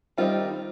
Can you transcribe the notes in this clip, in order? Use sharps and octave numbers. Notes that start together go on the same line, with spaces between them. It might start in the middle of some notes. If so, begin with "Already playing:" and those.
D#3 G3 C4 D#4 F4